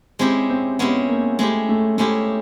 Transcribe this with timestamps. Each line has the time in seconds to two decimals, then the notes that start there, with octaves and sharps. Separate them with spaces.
0.19 G#3 C4 C#4 E4 G4
0.50 C4
0.79 G#3 B3 C#4 E4 G4
1.09 A#3
1.39 G#3 A3 C#4 E4 G4
1.69 A3
1.98 G#3 A3 C#4 E4 G4